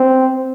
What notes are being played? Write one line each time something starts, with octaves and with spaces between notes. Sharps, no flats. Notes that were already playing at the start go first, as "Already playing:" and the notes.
Already playing: C4